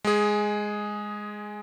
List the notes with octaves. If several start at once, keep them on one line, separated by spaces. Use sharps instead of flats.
G#3 G#4